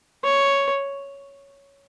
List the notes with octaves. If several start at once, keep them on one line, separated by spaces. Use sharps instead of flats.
C#5